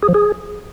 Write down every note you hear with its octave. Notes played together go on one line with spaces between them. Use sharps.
G#4
F3
G#4